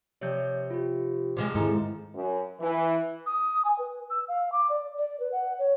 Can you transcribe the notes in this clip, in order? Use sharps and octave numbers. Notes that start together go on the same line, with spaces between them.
C3 F3 C#5 D5 G6
F4 G4
C3 F3 G#3
G#2 D#3 E4 A4 D#5 A#5
F#2
E3
D#6
G#5
B4
E6
F5
D6
D5
D5
B4
F#5
C#5